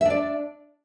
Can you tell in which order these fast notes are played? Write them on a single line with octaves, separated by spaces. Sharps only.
E5 D4 D5